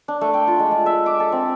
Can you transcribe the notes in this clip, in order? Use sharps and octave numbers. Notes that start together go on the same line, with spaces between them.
D4
A3
G5
F4
G#3
G#3
E5
D6
A4
C4